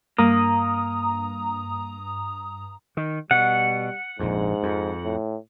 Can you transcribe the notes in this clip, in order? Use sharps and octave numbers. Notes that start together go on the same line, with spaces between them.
G2 A#3 A#5 D#6
D#3
B2 G3 F#5
A#1 F2 G#2
F2
A2